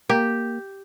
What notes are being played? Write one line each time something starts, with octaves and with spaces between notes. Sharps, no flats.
A#3 G4